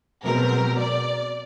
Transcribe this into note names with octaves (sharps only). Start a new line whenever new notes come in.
B2 F#3 G#3 C4 A#4
D5